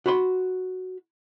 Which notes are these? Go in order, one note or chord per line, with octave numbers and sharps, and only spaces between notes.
F#4 B5 C6